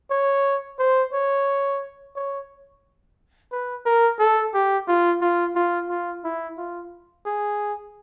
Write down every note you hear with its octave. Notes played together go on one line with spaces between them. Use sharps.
C#5
C5
C#5
C#5
B4
A#4
A4
G4
F4
F4
F4
F4
E4
F4
G#4